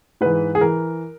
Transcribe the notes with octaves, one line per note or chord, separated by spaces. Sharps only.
G#2 E3 B4
G#4
E3 A#4